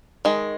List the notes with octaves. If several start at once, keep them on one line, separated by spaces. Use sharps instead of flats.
D#3 G#3